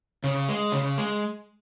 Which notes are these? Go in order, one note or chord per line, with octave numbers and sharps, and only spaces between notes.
C#3
G#3
C#3
G#3